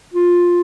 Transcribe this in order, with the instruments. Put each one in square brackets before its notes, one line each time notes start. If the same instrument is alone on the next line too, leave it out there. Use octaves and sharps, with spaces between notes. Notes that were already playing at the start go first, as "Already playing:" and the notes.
[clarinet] F4